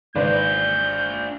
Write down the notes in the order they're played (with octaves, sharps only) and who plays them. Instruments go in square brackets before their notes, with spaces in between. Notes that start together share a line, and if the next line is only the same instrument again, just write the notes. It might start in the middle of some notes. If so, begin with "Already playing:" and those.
[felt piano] G#1 [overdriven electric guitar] D4 C5 [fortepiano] B4 D5 [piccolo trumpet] G6